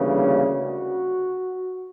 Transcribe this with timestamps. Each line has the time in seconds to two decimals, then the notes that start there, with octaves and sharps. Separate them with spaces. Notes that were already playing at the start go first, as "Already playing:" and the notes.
Already playing: D2 C#3 E3 G3 A#3
0.25 F#4